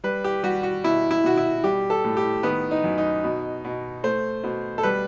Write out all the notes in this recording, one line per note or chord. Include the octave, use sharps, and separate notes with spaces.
G3 B4
G4
G3 F#4
F#4
B2 E4
E4
B2 F#4
E4
G3 G4
A4
A2
G4
D#3 B3
D#4
F#2
D#4
B2
B2
A3 C5
B2
A4
G3 B4